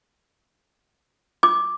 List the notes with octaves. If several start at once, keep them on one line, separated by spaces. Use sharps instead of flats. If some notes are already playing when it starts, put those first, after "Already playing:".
D6